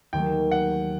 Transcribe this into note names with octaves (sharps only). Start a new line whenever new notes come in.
D#2 D#3 F#3 A3 G5
F#5